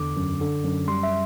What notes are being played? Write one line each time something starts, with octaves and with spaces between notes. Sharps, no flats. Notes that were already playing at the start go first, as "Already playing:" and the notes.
Already playing: E2 D3 D6
F#2
D3
F#2
G3 C6
E5